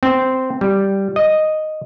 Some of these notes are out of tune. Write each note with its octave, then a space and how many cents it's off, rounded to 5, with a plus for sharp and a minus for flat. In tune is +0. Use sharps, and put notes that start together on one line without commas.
C4 -10
G3 -5
D#5 -5